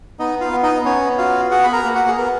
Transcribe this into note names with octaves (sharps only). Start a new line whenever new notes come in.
B3 D#4 D#5
F4 F5
B3
D#4 D#5
B3 C#4 C#5
F4 F#4 F5
F#4 G#4 F#5
B5
A#4 A#5
A#3
F#4 F#5
G#4
B3 A#4